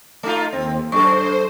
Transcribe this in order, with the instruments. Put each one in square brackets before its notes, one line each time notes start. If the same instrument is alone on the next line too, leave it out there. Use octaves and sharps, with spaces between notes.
[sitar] A3 D#4 F4
[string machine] D#2 [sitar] C4
[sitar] F#2 A4 [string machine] C5 [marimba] C#6